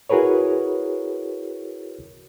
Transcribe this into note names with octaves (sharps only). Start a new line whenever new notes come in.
E4 F#4 G#4 A#4 B4 C#5